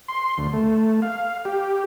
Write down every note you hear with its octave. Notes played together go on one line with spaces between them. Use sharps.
C6
D2
A3
F5
G4